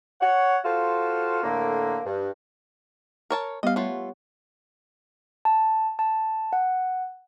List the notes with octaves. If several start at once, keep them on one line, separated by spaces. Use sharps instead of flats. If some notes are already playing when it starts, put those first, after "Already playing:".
C#5 F#5
F4 F#4 A4 C5 F5
A2 D3 A#3
G2
A#4 C#5 A5
G3 B3 D#5 F5
A3 F4 C#5 F#5
A5
A5
F#5